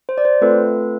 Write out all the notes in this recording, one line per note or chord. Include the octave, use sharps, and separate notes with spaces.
C5
D5
C5
A3 C4 F4 A4 B4